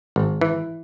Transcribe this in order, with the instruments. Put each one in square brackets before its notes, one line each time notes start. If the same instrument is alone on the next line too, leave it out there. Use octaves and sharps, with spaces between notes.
[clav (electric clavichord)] G#1
E3